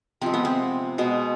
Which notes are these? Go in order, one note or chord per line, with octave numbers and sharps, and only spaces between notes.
C3 F3 G#3 C4
B3
C4
B2 G#3 B3